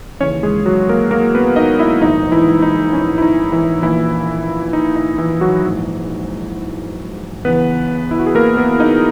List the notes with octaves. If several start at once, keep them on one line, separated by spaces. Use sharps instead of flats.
D#2 C#3 E3 C#4 C#5
G#3 G#4
F#3 F#4
A#3 A#4
A#3 A#4
B3 B4
D#4 D#5
E4 E5
A#1 G#2 D#3 D#4 D#5
E3 E4
D#4
C#4
E4
D#4
E3 E4
A#1 A#2 E3 E4
D#4
D#4
E3 E4
F#3 F#4
A#1 G#2 E3
E2 C#3 E3 B3 B4
E4
F#4
G#4
A#3 A#4
B3 B4
D#4 D#5